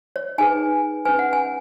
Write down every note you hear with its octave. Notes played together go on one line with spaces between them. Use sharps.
C#5
D#4 G#4 B4 G#5
C#4 B4 G#5
F#5
G#5